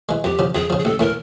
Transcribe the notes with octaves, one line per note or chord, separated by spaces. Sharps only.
E3 G#3
F2 G4
C#3 F3
F2 G#4
C#3 F3
G#4
A1 A4
A2 E3 A#4